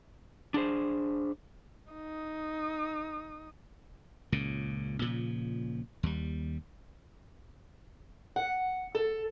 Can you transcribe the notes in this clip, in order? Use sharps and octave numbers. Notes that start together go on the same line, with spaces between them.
D4 G#4 C5
D#4 D#6
C#2 A#2 C#3
A#2 C#3 F3
D#2 G3
F#5
A4